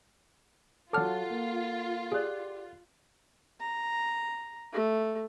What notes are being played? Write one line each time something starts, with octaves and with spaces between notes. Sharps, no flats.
F#3 F4 A4 C#5 F#5 A5 D6 F6
A#3
G4 G#4 D5 F#6
A#5
A3